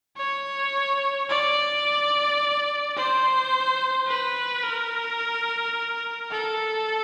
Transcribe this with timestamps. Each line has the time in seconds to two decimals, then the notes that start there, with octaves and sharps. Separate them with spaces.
0.17 C#5
1.29 D5
2.97 C5
4.08 B4
4.64 A#4
6.31 A4